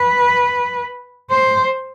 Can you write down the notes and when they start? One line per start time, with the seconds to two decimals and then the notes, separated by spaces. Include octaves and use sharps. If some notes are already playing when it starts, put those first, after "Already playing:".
Already playing: B4
1.30 C5